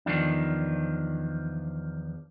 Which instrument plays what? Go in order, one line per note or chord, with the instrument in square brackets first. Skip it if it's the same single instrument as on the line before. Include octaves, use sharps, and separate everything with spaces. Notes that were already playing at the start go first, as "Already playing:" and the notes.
[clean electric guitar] E2 D#3 F3 D4